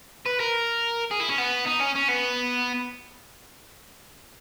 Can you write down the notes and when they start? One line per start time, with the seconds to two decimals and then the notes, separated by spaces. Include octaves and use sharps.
0.26 B4
0.40 A#4
1.11 G#4
1.20 E4
1.29 C#4
1.38 B3
1.67 D#4
1.81 C#4
1.96 C#4
2.09 B3